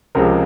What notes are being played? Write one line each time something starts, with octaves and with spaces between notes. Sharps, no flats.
C#2 C3 F3 G#3 A#4